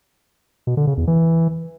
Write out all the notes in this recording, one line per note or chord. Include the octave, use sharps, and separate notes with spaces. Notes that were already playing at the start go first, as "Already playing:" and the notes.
B2
D3
C#3
E2
E3